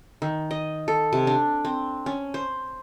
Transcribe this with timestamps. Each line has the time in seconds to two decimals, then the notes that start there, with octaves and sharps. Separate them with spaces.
0.22 D#3
0.51 D#5
0.88 A4
1.13 C3
1.27 D4
1.65 C4
2.06 C#4
2.34 C5